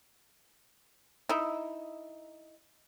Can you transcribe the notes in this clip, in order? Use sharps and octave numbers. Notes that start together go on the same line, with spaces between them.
D#4 E4